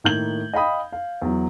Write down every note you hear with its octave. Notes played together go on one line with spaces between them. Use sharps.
A2 D#3 A#3 G6 G#6 F#7
D#5 F5 G5 B5 D#6
F5
E2 F#3